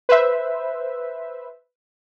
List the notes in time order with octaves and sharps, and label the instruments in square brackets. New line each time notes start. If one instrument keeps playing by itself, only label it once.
[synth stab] B4 C5 E5